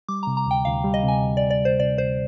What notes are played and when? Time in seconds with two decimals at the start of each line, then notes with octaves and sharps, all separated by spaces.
0.08 G3 D6
0.23 C3 A#5
0.37 A#5
0.46 D2 G5
0.65 D2 F5
0.84 G3
0.94 D#5
1.03 C3
1.08 G#5
1.22 D2
1.37 D5
1.42 D2
1.50 D5
1.60 G3
1.65 C5
1.79 C3 D5
1.98 D2 C5